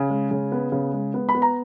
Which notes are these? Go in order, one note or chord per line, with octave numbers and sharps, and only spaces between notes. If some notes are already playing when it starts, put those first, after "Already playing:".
Already playing: C#3 G#5
G#3
C#3
B3
C#3
G#3
B3
B5
B3
A#5